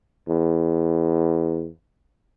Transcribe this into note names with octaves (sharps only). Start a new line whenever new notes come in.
E2